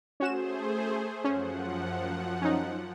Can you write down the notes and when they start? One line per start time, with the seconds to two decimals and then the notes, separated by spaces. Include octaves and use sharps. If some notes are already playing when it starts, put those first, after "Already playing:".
0.20 A3 C#4 F#4 G#4 C5 E7
1.24 F#2 F3 C#4 F#5
2.42 C#4 D#4